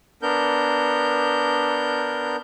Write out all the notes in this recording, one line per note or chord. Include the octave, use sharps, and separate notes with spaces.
B3 D4 A#4 G6